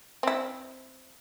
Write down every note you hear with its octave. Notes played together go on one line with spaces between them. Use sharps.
C4 E4